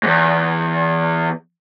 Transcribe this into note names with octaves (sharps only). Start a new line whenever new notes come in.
E2 G#2